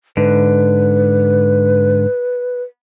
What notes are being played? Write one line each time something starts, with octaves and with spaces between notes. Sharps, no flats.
G#2 D3 B4